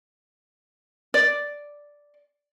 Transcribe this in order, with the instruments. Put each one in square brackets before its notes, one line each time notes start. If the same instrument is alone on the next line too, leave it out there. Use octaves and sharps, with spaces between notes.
[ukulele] D5